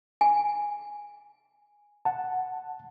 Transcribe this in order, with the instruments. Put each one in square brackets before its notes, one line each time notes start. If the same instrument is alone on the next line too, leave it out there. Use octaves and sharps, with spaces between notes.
[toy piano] G#5
[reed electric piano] F#5 A5